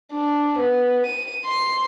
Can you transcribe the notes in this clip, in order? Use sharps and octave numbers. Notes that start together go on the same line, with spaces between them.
D4
B3
D#7
C6